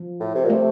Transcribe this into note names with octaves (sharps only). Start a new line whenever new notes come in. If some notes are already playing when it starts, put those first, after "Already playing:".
Already playing: F3
A2
C3
A#2
C3 A3